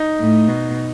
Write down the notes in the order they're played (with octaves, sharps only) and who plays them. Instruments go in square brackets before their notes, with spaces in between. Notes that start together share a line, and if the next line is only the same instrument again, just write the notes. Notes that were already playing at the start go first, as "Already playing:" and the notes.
Already playing: [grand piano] D#4
[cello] A2
B2